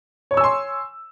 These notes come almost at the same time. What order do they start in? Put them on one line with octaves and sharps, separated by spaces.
C#5 C#6 E6 G#5 C6